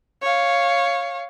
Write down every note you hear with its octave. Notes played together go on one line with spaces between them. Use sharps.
C#5 F5